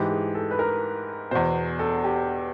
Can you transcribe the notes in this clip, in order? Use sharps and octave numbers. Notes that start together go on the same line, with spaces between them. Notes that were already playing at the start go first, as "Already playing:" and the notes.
Already playing: G#2 E3 G4
G#4
A4
B4
A#4
E2 B2 C5
A4
G4